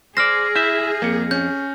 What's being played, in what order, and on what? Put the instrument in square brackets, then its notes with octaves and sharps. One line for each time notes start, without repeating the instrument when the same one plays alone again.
[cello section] G#4 [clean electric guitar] C5 D5 [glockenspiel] F6 A#6
[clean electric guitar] E4 E5 [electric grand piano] G6
[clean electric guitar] F2 [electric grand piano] A#3 C#7
[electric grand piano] C#4 [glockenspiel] G6